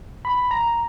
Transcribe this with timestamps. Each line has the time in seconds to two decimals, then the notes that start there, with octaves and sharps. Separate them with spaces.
0.25 B5
0.51 A#5